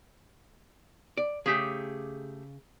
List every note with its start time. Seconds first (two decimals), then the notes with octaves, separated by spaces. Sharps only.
1.17 D5
1.46 C#3 A3 G4 G#4